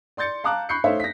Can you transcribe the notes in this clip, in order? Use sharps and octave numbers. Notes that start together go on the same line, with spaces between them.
D5 C6 G6 A6 C#7
F5 A5 A#5 D6 F#6
B5 C#6 F#6 G6 C7 C#7
A3 D#4 C5 C#5 E5 F5
A#6 B6